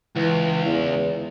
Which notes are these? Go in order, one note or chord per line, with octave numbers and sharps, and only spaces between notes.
C#2 E3
E2